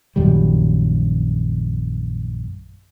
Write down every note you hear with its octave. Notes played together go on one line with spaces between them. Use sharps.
A#1 F#2 D#3 G3